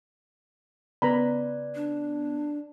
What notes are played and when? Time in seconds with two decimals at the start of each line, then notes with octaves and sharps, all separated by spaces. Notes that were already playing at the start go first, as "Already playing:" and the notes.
1.02 C#3 B3 B4 D5 A#5 B5
1.75 D4